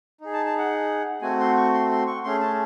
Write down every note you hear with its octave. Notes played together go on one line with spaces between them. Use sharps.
D#4 G#4
A5
A5
F#5
A3 C4 F#4 G#5
C6
C#6
C6
C6
C#6
A3 C#4 G#4 C6
A5